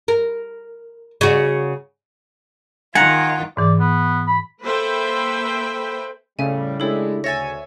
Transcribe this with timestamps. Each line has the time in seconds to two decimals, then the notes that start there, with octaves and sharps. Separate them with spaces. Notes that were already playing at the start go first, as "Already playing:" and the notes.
0.08 A#4
1.21 C#3 F#4
2.95 D#3 F4 F#5 G#5 A#5
3.57 G#2 E3 D5
3.79 B3
4.27 B5
4.63 A#3 A4 B4 C5 E5 G5
6.39 A2 C#3 G3 A3 C#4 E5 G#5
6.80 G#3 D4 E4 G4 A4 C#5
7.24 D2 C#5 E5 G#5 A6 A#6